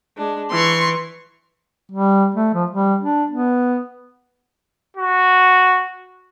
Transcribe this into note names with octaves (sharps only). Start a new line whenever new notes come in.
G#3 D4
E3 C6 C#6
G3
A3
F3
G3
D4
B3
F#4